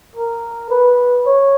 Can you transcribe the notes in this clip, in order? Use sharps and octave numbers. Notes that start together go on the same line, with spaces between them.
A#4
B4
C#5